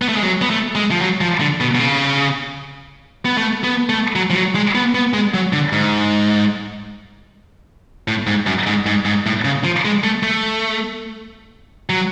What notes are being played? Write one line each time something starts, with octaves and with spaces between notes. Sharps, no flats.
B3
A3
G#3
F#3
B3
A3
G#3
F3
F#3
F3
D3
B2
B2
C#3
B3
A3
B3
A3
F#3
F3
F#3
G#3
B3
B3
G#3
F#3
D3
G#2
A2
G#2
F#2
G#2
G#2
G#2
A2
C#3
F3
G#3
A3
A3
F#3